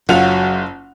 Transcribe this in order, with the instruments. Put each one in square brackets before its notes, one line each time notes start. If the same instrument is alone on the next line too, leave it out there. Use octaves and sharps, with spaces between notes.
[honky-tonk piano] F#1 F4 F7 [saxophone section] F#3 [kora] F#5